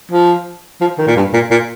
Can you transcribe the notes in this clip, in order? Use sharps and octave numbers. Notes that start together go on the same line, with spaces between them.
F3
F3
D#3
A#2
G2
A#2
A#2